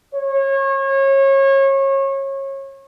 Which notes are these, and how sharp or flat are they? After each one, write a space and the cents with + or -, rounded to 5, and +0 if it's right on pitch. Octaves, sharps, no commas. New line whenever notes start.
C#5 -30